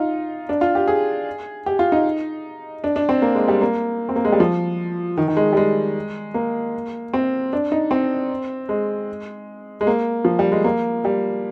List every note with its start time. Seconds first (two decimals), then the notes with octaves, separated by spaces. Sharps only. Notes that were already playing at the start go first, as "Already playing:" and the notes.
Already playing: D#4 F4
0.49 D4
0.61 F4
0.75 G4
0.88 G#4
1.66 G4
1.79 F4
1.92 D#4
2.84 D4
2.96 D4
3.09 C4
3.22 A#3
3.35 G#3
3.48 G3
3.61 A#3
4.09 C4
4.16 A#3
4.25 G#3
4.32 G3
4.40 F3
5.17 D#3
5.28 D#3
5.37 G#3
5.53 G3
5.57 G#3
6.34 A#3
7.13 C4
7.53 D4
7.72 D#4
7.91 C4
8.69 G#3
9.81 G#3
9.87 A#3
10.25 F3
10.39 G3
10.52 G#3
10.64 A#3
11.05 G3